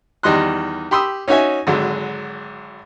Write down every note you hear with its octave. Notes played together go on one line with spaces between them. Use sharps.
E2 D#3 G3 D#5 C6 F#6
G4 B5 C6 D#6 E6
C#4 D#4 F#4 C#5 E5 G#5
G#1 D3 F#3 G#3